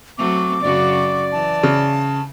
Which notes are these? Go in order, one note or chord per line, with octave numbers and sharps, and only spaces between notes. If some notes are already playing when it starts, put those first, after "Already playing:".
F#3 A3 C4 D6
F#2 C#3 F#4 D5
E3 A5
C#3